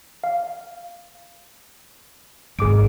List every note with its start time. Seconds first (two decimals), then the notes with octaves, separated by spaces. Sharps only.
0.24 F5
2.59 G#1 C#2 G#4 D6 D7